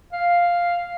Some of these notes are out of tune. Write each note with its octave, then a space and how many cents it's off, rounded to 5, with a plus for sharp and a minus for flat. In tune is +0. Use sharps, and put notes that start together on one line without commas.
F5 +0